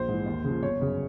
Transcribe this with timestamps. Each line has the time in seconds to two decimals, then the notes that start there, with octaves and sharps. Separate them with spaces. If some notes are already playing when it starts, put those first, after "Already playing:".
Already playing: A#1 C5
0.08 G#2 E3
0.26 D#2
0.44 C#3 F3
0.63 G1 C#5
0.80 F#2 C#3